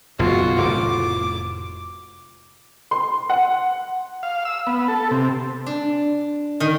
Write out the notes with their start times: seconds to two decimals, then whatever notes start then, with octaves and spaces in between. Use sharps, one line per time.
0.19 F#1 B1 F#2 F4 F#4
0.58 F1 A2 D6
2.91 C6
3.30 F#5
4.23 F5
4.45 E6
4.67 B3
4.88 A4
5.11 C3
5.66 D4
6.60 D#3